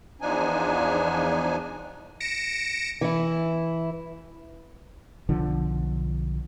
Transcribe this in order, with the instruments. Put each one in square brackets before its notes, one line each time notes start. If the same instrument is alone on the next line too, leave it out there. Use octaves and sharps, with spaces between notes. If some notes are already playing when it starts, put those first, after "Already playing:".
[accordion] E2 F3 D4 D#4 G#5
[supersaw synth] A#6 C#7 D7 E7
[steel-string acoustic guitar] E3 E4
[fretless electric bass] B1 D3 F3